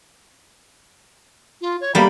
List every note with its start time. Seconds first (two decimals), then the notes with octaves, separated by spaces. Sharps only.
1.61 F4
1.81 C#5
1.95 G3 A#3 B3 B5